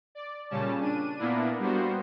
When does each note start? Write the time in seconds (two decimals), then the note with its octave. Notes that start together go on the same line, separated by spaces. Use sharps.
0.15 D5
0.50 A#2 C#3 G3 C#4 A5
0.81 D4 D#7
1.19 A#2 A#3 B3 D4 E4
1.59 G3 A#3 B3 F#4 C5